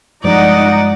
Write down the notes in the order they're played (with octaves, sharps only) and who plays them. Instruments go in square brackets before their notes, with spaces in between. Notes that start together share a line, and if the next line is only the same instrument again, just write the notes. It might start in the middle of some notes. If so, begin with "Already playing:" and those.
[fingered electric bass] G2 F3 G#3 [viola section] D#4 D#5 F#5 [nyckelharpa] D5